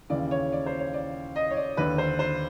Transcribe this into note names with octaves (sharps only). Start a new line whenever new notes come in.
D#2 C#3 E3 D5
C#5
D5
C5
C#5
D5
D#5
C#5
D5
D#2 D3 B4
C5
C5